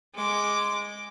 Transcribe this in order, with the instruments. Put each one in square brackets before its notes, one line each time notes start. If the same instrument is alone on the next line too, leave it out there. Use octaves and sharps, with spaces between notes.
[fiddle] G#3 D6